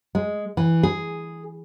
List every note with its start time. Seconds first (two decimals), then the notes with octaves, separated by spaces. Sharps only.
0.15 G#3
0.57 E3
0.83 G#4